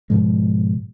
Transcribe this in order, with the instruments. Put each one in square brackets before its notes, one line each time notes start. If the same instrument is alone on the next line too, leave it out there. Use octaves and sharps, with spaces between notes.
[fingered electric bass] G#2 B2 F3 G#3